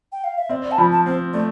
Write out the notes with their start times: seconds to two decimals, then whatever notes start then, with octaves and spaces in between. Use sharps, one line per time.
0.12 G5
0.24 F5
0.38 E5
0.49 C4 D5
0.63 D5
0.71 A5
0.78 F3 B5
0.91 A5
1.06 C4 C5
1.33 A3 D5